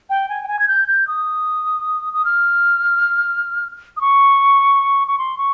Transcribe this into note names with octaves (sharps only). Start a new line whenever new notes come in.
G5
G#5
G5
G#5
G#6
G6
G6
D#6
D#6
F6
D#6
C#6
C#6
C6
C#6